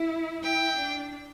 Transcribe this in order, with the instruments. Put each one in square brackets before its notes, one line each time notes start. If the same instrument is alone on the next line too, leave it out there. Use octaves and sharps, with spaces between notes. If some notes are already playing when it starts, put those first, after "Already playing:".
Already playing: [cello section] E4
[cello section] E4 [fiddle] G5
[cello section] D4